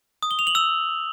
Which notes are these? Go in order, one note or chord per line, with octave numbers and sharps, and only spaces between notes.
D#6
G7
F7
F#7
E6